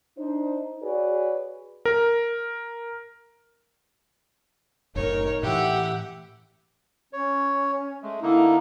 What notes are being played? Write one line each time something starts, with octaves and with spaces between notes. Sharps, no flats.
D4 D#4 C5
F#4 G#4 B4 C#5 D5
A#4
F#1 A2 D#4 A#4 C#5
A2 E3 G4 E5 F#5 G5
C#4 C#5
G#3 A3
D3 A#3 D#4 E4